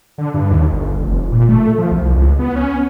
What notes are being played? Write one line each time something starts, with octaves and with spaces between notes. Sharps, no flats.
D3
G2
D#2
G1
F1
A#2
A3
F3
C2
C#2
B3
C#4